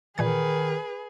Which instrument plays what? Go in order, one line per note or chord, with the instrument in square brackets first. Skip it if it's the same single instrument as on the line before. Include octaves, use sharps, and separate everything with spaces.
[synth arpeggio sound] A#2 E3 G#6 [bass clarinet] D#3 [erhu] G#4 [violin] B4